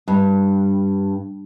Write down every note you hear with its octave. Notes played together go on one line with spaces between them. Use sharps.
G2